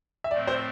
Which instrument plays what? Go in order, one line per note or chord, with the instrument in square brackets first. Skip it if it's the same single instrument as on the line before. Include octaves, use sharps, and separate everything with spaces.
[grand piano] E5
[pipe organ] A2 F3 A3 C4 [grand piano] D5
[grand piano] C5